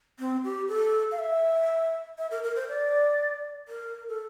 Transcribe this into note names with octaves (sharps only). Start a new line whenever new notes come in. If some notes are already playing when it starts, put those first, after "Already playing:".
C4
G4
A4
F5
E5
E5
A#4
A#4
C5
D5
A#4
A4